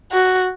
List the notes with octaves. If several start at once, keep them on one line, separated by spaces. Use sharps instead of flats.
F#4